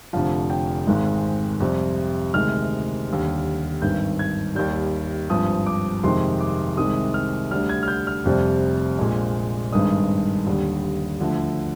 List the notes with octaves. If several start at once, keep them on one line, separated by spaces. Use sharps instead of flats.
F1 F2 D3 F3 F5
G5
G#1 G#2 D#3 G#3
F2 C3 G3
D2 C3 D#3 G#3 F6
D#2 D3 G3
G#1 G2 D#3 G6
G#6
D#2 D#3 G3 G6
G#1 G2 F3 D#6
D6
F2 C3 D#3 G#3 C6
D6
C2 C3 D#3 G#3 D#6
F6
D2 D3 G3 F6
G#6
F6
G6
F6
F1 F2 C3 G3
A#1 A#2 G#3
G#1 G2 D#3 G#3 D#6
D#2 D3 G3
D2 D3 F3